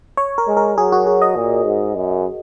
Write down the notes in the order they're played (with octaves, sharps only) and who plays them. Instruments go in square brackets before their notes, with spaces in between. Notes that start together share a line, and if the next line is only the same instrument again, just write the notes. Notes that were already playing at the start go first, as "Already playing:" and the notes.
[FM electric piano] C#5
A#4
[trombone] G#3
[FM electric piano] A#4
[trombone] F#3 [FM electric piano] G#4
[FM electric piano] F#4
G#4
D#5
[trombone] A#2
G#2
F#2